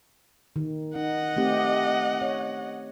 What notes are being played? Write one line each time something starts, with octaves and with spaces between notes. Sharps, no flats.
D#3
D#4 D#5 F#5
A3 C4 G4
C#5